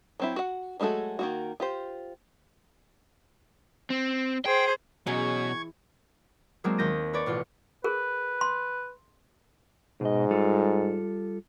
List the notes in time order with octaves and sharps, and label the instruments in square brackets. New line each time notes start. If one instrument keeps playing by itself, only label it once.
[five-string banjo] F#3 C4 E4
F#4 F#5
F#3 G#3 A3 F#4 A4
D#3 A#3 F#4
F4 G4 C5
[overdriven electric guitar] C4
[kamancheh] G#4 C5 [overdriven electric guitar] G5
[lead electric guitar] B2 [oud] E3 G#4 D#5 [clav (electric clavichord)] F#3 C#4 [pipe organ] C#6 G#6
[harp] F#3 G#3 A#3 C4 D4
D#2 G6 A#6 D#7
B4 C#5 D5
A1 B2 F4 C#7
[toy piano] G#4 A#4 [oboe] B4
[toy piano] C6
[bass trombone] G#2 [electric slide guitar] B2 D#5
[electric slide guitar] G3 F4 A4